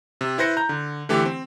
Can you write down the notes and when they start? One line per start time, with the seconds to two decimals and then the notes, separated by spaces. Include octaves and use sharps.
0.21 C3
0.38 E4 B4 C5 A#6 C#7
0.57 A#5 G6
0.69 D3
1.09 D3 E3 A3 G4
1.25 C4